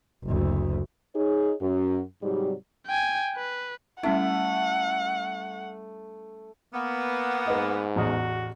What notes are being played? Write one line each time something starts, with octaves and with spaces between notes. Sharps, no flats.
F#1 D2
D#4 G#4 C#5
F#2
G#2 C3 F#3 G3
G5 G#5
B4
G3 A3 C#4 E4 F#5
A#3 B3
G#2 B4 D#5
A1 E2 F#4 D#6